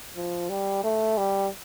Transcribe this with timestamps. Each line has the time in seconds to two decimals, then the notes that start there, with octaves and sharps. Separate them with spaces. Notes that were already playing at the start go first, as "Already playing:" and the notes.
0.16 F3
0.50 G3
0.84 A3
1.18 G3